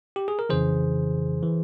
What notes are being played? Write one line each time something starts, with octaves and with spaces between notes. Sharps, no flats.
G4
G#4
A#4
F2 C#3 E3 G#4 C5
E3